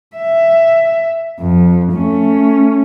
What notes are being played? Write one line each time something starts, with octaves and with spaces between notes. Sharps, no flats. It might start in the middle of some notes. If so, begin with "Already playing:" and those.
E5
F2
A3 C#4